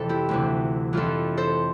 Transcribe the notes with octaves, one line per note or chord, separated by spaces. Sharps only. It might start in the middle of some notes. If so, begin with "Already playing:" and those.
Already playing: F2 C3 E3 A4
E4 G4
D2 C3 E3
F2 E3 F4 A4
A4 C5